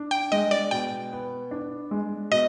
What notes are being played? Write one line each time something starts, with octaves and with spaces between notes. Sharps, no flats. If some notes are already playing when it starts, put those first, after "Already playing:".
Already playing: D4
G5
G#3 D#5
D5
B2 G5
B3
D4
G#3
B2 D#5